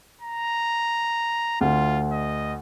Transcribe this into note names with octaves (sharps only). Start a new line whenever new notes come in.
A#5
D2 F4
D#5